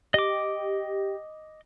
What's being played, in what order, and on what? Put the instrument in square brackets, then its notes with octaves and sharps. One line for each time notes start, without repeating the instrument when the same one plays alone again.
[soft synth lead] G4 [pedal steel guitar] D#5 D6